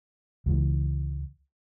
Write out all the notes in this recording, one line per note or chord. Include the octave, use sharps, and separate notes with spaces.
C#2 E3